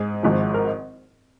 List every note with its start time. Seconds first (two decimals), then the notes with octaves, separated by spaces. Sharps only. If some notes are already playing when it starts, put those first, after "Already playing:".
Already playing: G#2 G#4
0.23 G#1 G#2 F3
0.54 A#4